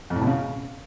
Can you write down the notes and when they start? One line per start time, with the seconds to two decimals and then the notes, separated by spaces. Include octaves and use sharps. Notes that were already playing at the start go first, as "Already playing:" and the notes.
0.10 F2
0.16 A2
0.21 B2
0.27 C#3